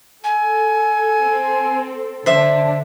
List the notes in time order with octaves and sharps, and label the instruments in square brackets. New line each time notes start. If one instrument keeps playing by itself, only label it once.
[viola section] A4 [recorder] G#5
[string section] C4
[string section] D3 D4 [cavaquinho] C5 E5